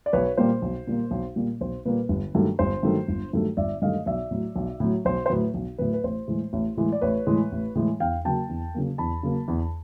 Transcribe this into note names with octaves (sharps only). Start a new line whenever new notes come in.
D5
B1 B4 C#5
A#2 G3 A#3 C5
B1
A#2 G3 A#3
B1
A#2 G3 A#3
B1 C5
A#2 G3 A#3 B4
G1
G2 D#3 F#3 A3
G1 C5
G2 D#3 F#3 A3
G1
G2 D#3 F#3 A3
G1 D5 E5
G2 D#3 F#3 A3 D#5 F5
B1 D5 E5
A2 F#3
B1
A2 F#3
B1 C5
C5
A2 F#3 B4
B1
A2 F#3 B4
B4
A1 C5
A2 E3 G#3
A1
A2 E3 G#3
D5
A1 B4 C#5
A2 E3 G#3
A1
A2 E3 G#3
E2 F5 G5
C#3 F#3 A#3 G5 A5
E2
C#3 F#3 A#3
E2 A5 B5
C#3 F#3 A#3
E2